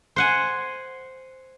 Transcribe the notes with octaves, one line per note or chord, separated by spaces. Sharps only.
C5 F#5 G#5